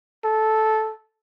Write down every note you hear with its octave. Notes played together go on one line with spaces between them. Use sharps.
A4